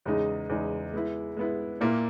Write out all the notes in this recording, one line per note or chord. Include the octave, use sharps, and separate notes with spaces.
E2 C#3 G#3 D#4
E2 C#3 G#3 D#4
G#3 B3 E4
G#3 B3 E4
A#2 A#3 E4